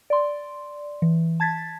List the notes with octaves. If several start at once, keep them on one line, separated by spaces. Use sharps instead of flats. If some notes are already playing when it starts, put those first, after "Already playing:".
D5 C6
E3
A5 G#6 A6 B6